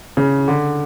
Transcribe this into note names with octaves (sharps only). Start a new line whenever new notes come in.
C#3
D3